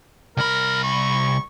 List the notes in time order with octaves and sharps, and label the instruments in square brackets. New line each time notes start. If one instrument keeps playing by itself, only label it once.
[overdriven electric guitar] C2 B5 [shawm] A#4
[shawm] C#6